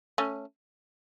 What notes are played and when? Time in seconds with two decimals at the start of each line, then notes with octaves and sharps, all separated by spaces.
0.18 A3 C#4